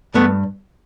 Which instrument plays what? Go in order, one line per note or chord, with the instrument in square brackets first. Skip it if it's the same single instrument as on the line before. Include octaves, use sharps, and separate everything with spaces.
[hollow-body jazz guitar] G2 A3 B3